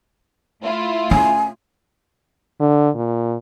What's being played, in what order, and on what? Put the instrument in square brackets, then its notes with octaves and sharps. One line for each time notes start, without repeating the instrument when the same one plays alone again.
[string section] A3 E4 F4
[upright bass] C#4 [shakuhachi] G#5
[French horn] D3
A#2